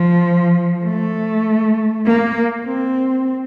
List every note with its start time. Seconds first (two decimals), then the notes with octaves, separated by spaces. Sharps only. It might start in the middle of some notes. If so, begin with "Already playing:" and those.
Already playing: F3
0.84 A3
2.05 A#3
2.66 C4